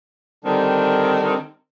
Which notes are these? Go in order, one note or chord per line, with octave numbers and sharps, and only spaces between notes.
D3 D#3 G3 C4 D4